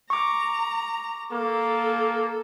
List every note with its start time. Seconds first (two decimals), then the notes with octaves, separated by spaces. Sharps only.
0.10 A#5 C#6 D6
1.32 A#3 A4